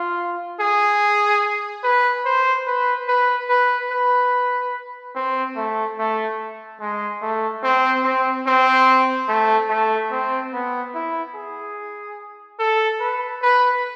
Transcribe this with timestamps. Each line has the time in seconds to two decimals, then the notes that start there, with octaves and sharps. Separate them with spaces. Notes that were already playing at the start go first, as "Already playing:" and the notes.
Already playing: F4
0.60 G#4
1.84 B4
2.25 C5
2.67 B4
3.08 B4
3.49 B4
3.91 B4
5.15 C4
5.56 A3
5.98 A3
6.81 G#3
7.22 A3
7.63 C4
8.04 C4
8.46 C4
9.28 A3
9.69 A3
10.11 C4
10.53 B3
10.94 E4
11.34 G#4
12.59 A4
13.00 B4
13.42 B4